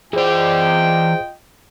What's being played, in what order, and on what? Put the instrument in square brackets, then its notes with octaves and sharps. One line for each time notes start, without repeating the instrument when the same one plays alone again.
[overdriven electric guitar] E3 D5 [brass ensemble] F4 D#5 G5 [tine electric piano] G#4 C5